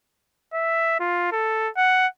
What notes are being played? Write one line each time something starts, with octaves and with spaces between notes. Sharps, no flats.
E5
F4
A4
F#5